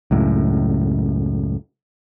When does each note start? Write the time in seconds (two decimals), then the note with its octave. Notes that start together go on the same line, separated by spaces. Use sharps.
0.11 C#2 F#2 A2